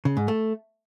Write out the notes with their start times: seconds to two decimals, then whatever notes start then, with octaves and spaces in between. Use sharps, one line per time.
0.05 C#3
0.17 G#2
0.28 A3